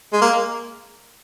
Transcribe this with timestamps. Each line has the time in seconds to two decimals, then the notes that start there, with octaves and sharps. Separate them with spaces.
0.13 G#3
0.22 A#3